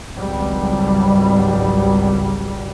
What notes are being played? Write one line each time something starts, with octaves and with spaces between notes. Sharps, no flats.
G#1 C#2 F#3 G3